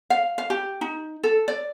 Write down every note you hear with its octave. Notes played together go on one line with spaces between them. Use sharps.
F5
F5
G4
D#4
A4
D5